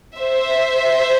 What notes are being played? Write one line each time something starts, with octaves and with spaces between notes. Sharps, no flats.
C5 E5